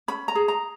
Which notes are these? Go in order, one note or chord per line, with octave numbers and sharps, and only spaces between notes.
C#4 B5
A#5
G#4
A#5